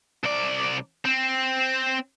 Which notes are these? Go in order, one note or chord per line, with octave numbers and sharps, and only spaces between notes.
C2 D5
C4